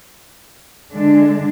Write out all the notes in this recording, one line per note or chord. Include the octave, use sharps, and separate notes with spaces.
D3 G#3 D4